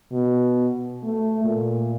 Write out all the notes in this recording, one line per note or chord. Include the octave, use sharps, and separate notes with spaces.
B2
A3
A#2